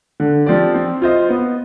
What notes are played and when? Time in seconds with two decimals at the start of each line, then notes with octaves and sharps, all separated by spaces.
0.20 D3
0.46 F3 C4 G4 D5
0.74 C4
1.02 F4 C5 D#5
1.29 B3